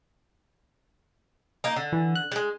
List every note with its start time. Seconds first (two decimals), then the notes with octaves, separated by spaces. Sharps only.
1.64 A#3 D#4
1.76 D3
1.92 E3
2.15 F#6
2.32 G3 G#3